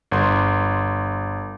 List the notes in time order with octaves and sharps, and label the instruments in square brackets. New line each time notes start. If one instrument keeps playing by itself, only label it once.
[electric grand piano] G1 C6